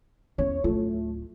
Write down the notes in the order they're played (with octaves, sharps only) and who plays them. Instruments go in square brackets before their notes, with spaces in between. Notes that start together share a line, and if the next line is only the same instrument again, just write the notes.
[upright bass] E2 C#4 [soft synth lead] C#5
[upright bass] D1 F4 [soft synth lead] A3